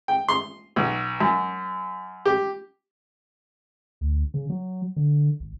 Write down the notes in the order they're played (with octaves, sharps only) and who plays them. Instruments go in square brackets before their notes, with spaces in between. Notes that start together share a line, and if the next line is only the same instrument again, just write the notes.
[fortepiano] G5
C6
B1
F#2
G4
[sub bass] D2
C#3
F#3
D3
G#1